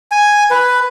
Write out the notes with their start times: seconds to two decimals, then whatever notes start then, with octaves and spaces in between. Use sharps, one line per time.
0.12 G#5
0.50 B4